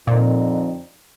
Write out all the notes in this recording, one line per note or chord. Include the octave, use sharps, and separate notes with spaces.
F2 A#2 D3 F3 C4 D#4